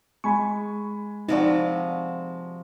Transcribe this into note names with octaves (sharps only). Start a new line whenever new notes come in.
G#3 G#5 B5 C#6
C3 F3 D#4 F#4 D5